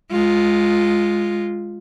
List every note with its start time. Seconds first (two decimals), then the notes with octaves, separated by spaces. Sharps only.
0.11 G#3 F4